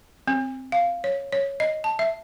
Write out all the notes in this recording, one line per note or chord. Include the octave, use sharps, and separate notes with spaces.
C4
F5
C#5
C#5
D#5
A5
E5